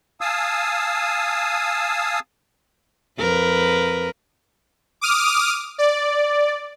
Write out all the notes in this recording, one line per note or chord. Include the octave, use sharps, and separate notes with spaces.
F5 G#5 A5 D#6 E6
F2 A#4 B4
D6 D#6 F6
D5